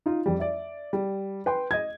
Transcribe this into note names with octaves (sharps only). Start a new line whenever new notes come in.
D#4 F4
F2 G3
D5 E5
G3
B4 G5 C6
D#5 G#6